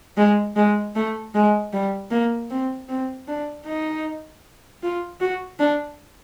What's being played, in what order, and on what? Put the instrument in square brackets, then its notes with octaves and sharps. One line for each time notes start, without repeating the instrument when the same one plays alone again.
[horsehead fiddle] G#3
G#3
A3
G#3
G3
A#3
C4
C4
D4
D#4
F4
F#4
D4